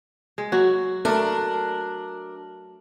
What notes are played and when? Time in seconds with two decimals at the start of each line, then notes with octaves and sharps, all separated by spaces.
0.38 G#3
0.52 F#3 F#4
1.05 A3 D4 A#4